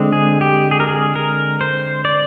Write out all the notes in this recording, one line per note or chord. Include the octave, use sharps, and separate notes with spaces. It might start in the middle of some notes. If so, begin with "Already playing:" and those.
Already playing: D3 G#3 C4
G#4
G4
G#4
A#4
G#4
A#4
C5
D5